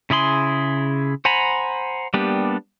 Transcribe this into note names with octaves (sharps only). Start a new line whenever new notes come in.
C#3 E4 G#4 C6
C5 F#5 G#5 A#5 B5
G3 A#3 B3 D4 G4